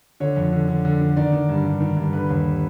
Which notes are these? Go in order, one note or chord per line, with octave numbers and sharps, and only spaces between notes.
D3 C#5
F2
D3
D3
D3
D3
D#3 D5
D#3
G2
G2
D#3
G2
D3 B4
D#2